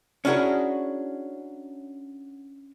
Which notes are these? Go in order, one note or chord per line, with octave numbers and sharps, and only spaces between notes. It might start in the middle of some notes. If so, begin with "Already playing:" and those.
C#4 D4 E4 F#4 G#4 A#4